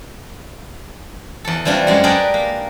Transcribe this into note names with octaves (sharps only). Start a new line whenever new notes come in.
E2 A4
E3 G3 C4 D4 F4 F#4
F#2 G#3 F#4
D4 G4 G#4 A#4 B4 D5
A#3